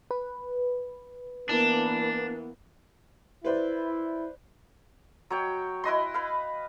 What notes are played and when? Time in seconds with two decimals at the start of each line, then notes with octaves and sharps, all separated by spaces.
0.11 B4
1.49 E3 A#3 B3 D4
3.45 E4 B4 C5 D5
5.30 F#3 C#5 G5
5.84 E4 B4 D#5 C6
6.14 B4 F5